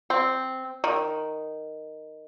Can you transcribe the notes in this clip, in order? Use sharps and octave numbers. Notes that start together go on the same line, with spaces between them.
C4
D#3